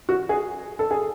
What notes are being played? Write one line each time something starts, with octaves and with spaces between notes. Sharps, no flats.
F#4
G#4
A4
G#4